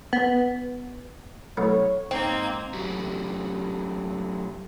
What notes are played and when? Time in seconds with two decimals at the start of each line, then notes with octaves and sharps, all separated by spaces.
0.13 B3
1.57 B1 A2 B3 C#5
2.11 G#2 A#3 C4 D#4 G#6
2.73 F#3 A3 C#4 F#4 G4